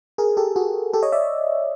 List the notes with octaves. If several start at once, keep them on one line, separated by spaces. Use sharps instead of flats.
G#4 A#4
G4 A4
F#4 G#4
G4 A4
C#5 D#5
D5 E5